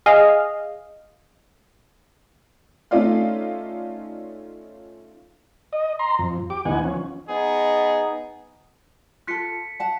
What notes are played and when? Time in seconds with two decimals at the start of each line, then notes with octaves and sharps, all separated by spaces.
0.06 G#4 D#5 F5
2.91 A3 C#4 D#4 F4 D5 F5
5.73 D#5
5.99 A#5 C6
6.19 F2
6.50 G4 D6
6.65 D2 E3 B3 D#4 F#5 G#5
6.84 F3 C#4
7.28 B3 D#4 G#4
9.27 F4 A4 F#6 B6 C#7
9.80 F#5 A5